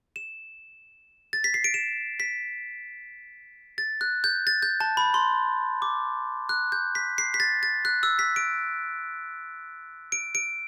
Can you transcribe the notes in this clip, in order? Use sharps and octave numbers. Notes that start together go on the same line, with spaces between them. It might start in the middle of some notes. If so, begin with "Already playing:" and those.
E7
A6
B6
C7
D7
E7
B6
A6
F#6
G6
A6
G6
A5
B5
C6
D6
F#6
G6
B6
C7
B6
A6
A6
F#6
E6
B6
D7
D7
D7